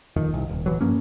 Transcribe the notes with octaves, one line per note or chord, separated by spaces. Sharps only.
D#1 F2 D#3
C2
D#1
D1 E3 F#3
G2 F3 A#3 C#4